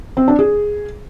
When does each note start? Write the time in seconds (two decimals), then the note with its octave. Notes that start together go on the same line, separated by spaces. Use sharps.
0.17 C4
0.28 D4
0.39 G#4